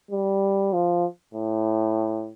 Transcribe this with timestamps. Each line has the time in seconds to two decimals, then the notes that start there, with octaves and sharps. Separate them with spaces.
0.11 G3
0.73 F3
1.34 A2